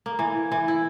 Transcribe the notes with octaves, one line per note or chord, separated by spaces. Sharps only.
A#3
E3
E3
E4